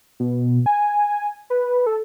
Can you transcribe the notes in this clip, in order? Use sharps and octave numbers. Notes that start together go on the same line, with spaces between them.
B2
G#5
B4
A4